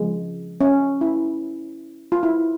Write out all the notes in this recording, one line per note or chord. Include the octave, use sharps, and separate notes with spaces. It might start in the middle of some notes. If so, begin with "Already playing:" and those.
Already playing: C#3 F3 G#3
C#4
E4
F4
E4